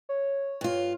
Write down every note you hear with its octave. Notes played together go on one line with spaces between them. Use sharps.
C#5
G2 F4